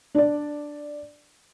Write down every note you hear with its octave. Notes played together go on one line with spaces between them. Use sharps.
D4 D5